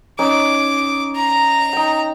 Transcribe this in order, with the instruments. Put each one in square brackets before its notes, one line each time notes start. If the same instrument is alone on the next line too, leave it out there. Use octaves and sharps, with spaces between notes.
[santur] C#4 D#4 G#5 [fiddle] D6
[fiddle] A#5
[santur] D#4 G5